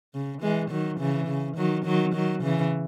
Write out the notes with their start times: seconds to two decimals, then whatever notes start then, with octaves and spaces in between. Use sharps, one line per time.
0.14 C#3
0.42 E3 G#3
0.70 D#3 F#3
1.00 C#3 E3
1.28 C#3
1.57 D#3 F#3
1.85 D#3 F#3
2.14 D#3 F#3
2.43 C#3 E3